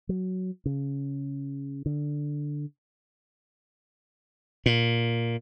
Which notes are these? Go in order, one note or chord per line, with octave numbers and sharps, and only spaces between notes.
F#3
C#3
D3
A#2